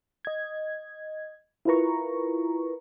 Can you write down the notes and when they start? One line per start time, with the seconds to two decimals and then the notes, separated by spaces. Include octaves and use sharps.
0.25 D#5 G#6
1.65 E4 F4 A#4 B4 A#5 C#6